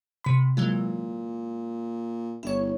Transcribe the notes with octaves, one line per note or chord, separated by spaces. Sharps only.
C3 B5
A#2 E3 F#3 G#3
G1 E4 C#5